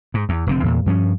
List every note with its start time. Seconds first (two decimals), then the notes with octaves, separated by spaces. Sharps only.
0.14 G#2
0.29 E2
0.47 F1 D3 C4
0.63 E2 A#2
0.86 G2 F3 C#4